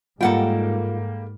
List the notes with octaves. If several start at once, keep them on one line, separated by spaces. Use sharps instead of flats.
G#2 G3 A#3 F4 A4 A#4 F#5 G5